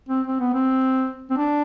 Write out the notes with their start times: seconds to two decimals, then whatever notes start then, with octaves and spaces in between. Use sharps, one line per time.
0.09 C4
0.27 C4
0.40 B3
0.53 C4
1.30 C4
1.37 D4